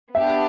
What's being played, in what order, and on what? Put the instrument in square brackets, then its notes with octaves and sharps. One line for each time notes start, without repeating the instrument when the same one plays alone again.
[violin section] B3 D4 G4 [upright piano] E5